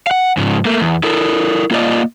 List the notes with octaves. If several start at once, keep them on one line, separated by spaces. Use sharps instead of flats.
F5 F#5
G#2 C#3 F3
A3 A#3
E2
E4 A4 A#4
A#3 F4 F#4 B4 D5 D#5